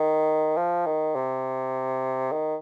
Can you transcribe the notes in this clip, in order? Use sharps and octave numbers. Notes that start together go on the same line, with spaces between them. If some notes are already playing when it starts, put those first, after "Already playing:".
Already playing: D#3
F3
D#3
C3
D#3